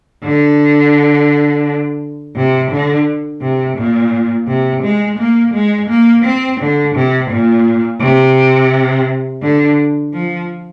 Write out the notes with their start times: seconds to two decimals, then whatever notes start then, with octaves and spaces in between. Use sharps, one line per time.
0.24 D3
2.36 C3
2.70 D3
3.42 C3
3.77 A#2
4.48 C3
4.83 G#3
5.18 A#3
5.54 G#3
5.89 A#3
6.24 C4
6.60 D3
6.95 C3
7.30 A#2
8.01 C3
9.42 D3
10.13 F3